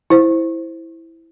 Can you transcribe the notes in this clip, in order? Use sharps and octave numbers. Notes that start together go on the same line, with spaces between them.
E4 C5